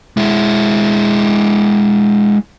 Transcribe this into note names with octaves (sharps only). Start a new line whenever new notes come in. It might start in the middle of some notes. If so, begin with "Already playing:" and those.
G#3 E4